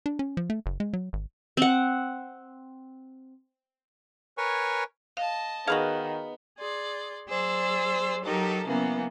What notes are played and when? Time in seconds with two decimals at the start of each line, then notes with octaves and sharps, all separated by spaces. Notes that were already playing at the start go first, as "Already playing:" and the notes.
0.06 D4
0.19 C#4
0.37 F3
0.50 A3
0.66 F#1
0.80 G#3
0.93 F#3
1.13 G#1
1.57 C4 F#5
4.38 A#4 B4 C#5 G#5 C#6
5.17 D#5 F5 A5
5.68 D#3 B3 F#4 G#4 B4 F5
6.59 G#4 D5 C6
7.28 F#3 G#4 C5 D5 E6
8.24 F#3 D#4 G4 A4 A#4
8.66 C#3 E3 F#3 A#3 B3